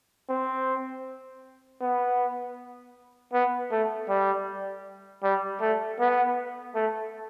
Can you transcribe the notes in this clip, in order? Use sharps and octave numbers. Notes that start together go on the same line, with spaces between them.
C4
B3
B3
A3
G3
G3
A3
B3
A3